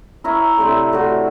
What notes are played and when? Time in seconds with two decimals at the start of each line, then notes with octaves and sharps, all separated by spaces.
0.24 E4 A#4 C#5 E5
0.58 A2 C3 C4 D4
0.93 A2 F#4